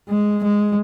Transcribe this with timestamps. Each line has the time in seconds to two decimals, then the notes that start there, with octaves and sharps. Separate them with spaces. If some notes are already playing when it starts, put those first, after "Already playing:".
0.09 G#3
0.43 G#3